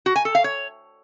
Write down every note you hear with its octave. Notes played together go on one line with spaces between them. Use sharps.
F#4
G#5
A4
F5
C#5